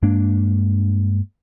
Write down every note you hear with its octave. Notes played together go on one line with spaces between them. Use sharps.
G2 G#3 A#3 D4